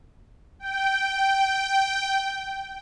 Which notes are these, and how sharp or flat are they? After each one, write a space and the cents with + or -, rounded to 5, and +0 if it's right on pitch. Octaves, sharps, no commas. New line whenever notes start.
G5 -10